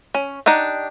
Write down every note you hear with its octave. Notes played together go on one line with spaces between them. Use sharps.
C#4
D4 D#4 G4 F#5